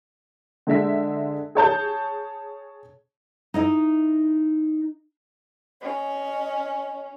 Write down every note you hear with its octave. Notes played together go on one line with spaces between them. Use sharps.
D3 G#3 E5 B6
G#4 C#5 A5 G6
D#4 E4 D#5
C#4 D#5